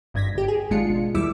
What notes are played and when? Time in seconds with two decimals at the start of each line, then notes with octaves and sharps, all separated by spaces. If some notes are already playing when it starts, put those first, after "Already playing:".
0.14 G#1 G2 G#6 A#6 B6
0.35 G1 G4
0.48 G#4
0.70 G#1 B2 G#3 D4 F4 C#7
1.15 D#2 G3 E4 D6 E6